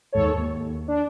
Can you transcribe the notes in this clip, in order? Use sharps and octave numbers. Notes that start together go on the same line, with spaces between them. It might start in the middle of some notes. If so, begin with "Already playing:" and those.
D#2 G#2 A4 C#5
D#2
D4